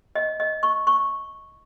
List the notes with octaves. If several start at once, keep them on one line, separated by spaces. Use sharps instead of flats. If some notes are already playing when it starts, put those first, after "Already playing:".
D#5
D#5
C#6
C#6